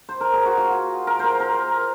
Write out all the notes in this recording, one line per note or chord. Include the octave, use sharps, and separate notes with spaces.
C5
A#4
G#4
F#4
F4
A#4
A#4 C5
A#4